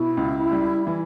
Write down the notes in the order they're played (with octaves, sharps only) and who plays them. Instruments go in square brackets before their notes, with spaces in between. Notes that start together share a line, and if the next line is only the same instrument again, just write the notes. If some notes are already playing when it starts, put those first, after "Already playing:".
Already playing: [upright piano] B2 [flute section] E4
[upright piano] C#2
G3
E3